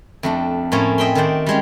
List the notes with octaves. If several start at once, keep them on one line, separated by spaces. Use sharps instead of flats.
F2 A3 D4
A2 F3 A3 A#3 C#4
D#5 E5 G5 B5 C6
D#3 A3 F#4 C5 D5
G3 G#3 C#4